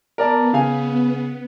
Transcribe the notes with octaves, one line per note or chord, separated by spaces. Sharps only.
B3 A#4 D5 A5
C#3 F5 G#5